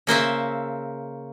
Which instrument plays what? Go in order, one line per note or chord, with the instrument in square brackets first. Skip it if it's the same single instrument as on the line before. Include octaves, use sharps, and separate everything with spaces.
[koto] C#3 A#3 C5 E5